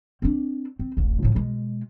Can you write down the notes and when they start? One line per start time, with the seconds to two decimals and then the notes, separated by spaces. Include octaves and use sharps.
0.22 C4 D4
0.79 C4
0.97 D1 A1
1.23 A2 F3
1.35 B2 G#3